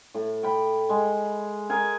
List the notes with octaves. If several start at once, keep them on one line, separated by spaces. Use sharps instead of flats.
A2
G5 B5
G#3
G#4 A#4 G#5